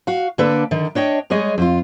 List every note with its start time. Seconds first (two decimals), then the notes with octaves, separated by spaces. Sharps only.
0.07 F#4 F5
0.38 D3 A#3 D4 A4 B4
0.71 D3 D#3
0.95 D4 C#5 D#5 G5
1.30 G3 G#3 G#4 C#5 D#5
1.58 F2 F4